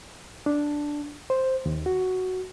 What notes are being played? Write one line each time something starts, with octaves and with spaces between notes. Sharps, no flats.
D4
C5
D#2
F#4